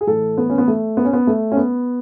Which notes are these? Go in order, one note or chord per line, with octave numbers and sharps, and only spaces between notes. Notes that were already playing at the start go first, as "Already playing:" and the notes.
G#4
A2 E3 A4
B3
C#4
B3
A3
B3
C#4
B3
A3
C#4
B3